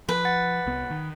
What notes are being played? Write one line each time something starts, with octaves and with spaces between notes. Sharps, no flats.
F3 B4
F#5 A6
C2 B3
D#3